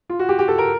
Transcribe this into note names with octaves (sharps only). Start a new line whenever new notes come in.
F4
F#4
G4
G4
A4
A#4